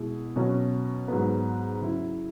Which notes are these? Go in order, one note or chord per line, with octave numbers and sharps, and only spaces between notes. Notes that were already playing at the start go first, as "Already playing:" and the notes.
Already playing: B2 G#3 E4 G#4
B2 F#3 C#4
G#2 F#3 B3
C#3 F#3 E4